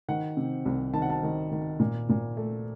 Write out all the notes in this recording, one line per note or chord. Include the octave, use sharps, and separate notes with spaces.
D#3 F#5
C3
C2
D#3 A5
F#5
A5
D#3
D#3
A#2
A#2
A3